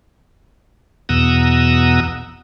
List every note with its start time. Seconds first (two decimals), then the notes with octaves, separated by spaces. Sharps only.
1.09 E2 B2 F#5 A#5 D#6 E6